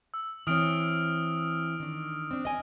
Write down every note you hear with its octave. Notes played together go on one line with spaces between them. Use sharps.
E6
E3 C4 C#5 D#6 F6 D7
D#3 D4
C4 D4
D#5 G#5